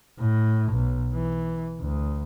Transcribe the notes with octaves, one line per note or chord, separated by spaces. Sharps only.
A2
B1
E3
D2